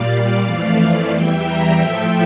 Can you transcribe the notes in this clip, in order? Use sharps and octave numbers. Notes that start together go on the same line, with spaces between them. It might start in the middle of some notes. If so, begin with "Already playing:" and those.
Already playing: A#2 G3 D5 F5
F2 E3 A3 D5 F5
E2 E3 G3 E5 G5
G5 A#5
A2 F3 A3 E5 G5